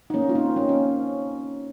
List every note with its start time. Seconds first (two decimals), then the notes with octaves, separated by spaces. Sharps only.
0.10 D#4
0.14 A#3 C#4
0.29 F4
0.35 C4 D#4
0.56 A#3 C#4
0.69 C#4